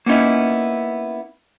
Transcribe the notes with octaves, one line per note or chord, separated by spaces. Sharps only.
A#3 B3 C#4 D#4 E4